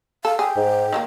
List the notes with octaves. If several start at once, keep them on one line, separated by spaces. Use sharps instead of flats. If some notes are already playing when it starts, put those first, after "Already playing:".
A4 F5
G#4 G5
G#2
D#3 G#3 A#3